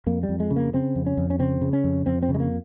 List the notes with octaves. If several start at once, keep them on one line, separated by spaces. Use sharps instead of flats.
F2 A#3
G3
F2
G#3
C#3
A#3
C#3 C4
F2
C#4
F2
C#4
C#3 C4
C#3
C#4
F2
F2 C4
C4
C#3
G#3
A#3